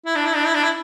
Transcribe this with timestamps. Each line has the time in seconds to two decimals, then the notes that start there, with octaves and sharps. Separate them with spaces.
0.06 E4
0.15 D4
0.26 E4
0.35 D4
0.46 E4
0.54 D4
0.64 E4